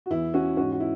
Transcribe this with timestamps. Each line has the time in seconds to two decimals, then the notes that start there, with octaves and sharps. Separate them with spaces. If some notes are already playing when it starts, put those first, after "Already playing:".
0.06 F#4
0.10 E2 E3 E4
0.34 C#4 F#4
0.57 G#2 E3 C#4 F#4
0.72 F#4
0.80 E4